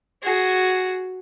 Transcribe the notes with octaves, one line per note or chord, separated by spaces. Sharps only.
F#4 G#4